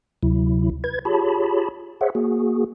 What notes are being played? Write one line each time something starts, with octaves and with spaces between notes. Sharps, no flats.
D2 C3 F#3 E4
B4 G#6
F4 G4 G#4 C#5 A5 B5
G#4 C5 C#5 E5 F#5
A#3 F#4 G#4